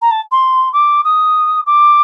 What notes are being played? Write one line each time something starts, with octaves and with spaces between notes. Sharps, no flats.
A#5
A5
C6
D6
D#6
D6